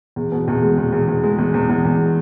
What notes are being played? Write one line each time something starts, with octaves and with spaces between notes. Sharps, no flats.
E2
B2
E2
G#3
E2
E2
E2
G#3
E2
E2
E2
E2